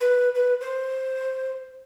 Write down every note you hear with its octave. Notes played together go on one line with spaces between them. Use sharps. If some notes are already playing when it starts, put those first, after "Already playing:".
B4
B4
C5